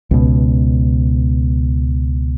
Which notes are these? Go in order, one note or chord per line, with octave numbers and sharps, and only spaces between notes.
C#2 B2